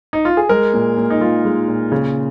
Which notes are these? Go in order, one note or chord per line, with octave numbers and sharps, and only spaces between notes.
D#4
F4
G#4
G#3 A#4
A#2
A#2
D#4
G#3 F4
G#3
A#2
C#3